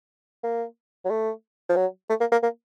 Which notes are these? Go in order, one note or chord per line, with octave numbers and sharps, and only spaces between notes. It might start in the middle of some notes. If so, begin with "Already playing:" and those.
A#3
F#3
A3
F3
F#3
A3
A#3
A#3
A#3